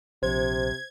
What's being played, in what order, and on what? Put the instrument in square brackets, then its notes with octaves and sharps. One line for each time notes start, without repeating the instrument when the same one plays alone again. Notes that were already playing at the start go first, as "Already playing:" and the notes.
[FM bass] A#1 [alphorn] C3 [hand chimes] C5 [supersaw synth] G#6